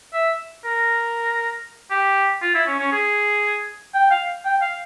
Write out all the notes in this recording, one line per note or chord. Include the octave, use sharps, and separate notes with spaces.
E5
A#4
G4
F4
E4
C#4
C#4
G#4
G5
F5
G5
F5